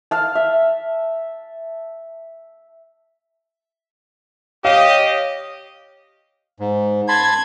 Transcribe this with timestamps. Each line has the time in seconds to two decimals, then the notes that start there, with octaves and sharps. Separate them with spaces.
0.11 F5 A5
0.35 E5
4.65 G4 C#5 D#5 F5
6.60 G#2
7.09 A5 B5 C6 G#6